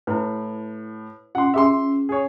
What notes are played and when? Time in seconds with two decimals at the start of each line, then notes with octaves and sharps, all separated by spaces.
0.07 A2 E4 B4
1.35 C#4 F4 F#5 C6
1.54 C#4 G#4 E5 C6
2.09 G#4 C#5